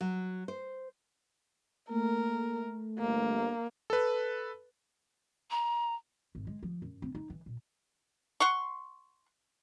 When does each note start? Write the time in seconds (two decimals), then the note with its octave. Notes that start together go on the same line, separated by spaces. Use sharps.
0.01 F#3
0.48 C5
1.90 A3 A#3 A#4
2.99 G1 A#3
3.90 A4 B4
5.51 A#5
6.35 G#1
6.47 G#3
6.63 F3
6.82 F#2
7.02 C4
7.15 D#4
7.30 E3
7.46 A#2
8.40 F#5 C6 C#6